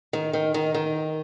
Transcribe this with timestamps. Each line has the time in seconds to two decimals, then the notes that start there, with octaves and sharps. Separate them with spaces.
0.13 D#3
0.33 D#3
0.54 D#3
0.74 D#3